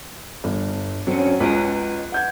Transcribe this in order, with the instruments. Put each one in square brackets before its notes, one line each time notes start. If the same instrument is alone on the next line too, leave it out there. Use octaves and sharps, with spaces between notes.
[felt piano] G1
[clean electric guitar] D3 C#4 [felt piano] F#3 C4
[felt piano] C#2 [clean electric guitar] B4 D#5 A#5
[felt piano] F#5 G6 G#6